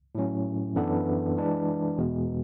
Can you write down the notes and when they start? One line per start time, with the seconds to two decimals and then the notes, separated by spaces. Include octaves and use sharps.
0.15 A2 F#3 C#4
0.76 F#2 E3 B3 D4 A4
1.37 E3 G#3 D4
1.98 E2 B2 G#3